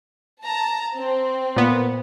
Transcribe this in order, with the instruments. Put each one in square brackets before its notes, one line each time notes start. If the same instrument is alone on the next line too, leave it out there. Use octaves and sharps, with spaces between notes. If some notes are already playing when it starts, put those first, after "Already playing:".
[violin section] A5 A#5
C4
[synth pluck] A#2 B3